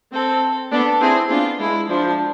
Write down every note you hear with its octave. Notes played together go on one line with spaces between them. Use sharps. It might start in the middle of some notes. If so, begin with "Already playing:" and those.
C4 A4
B3 D4 A4
C4 E4 G#4
B3 D4 F4
G#3 E4
F3 D4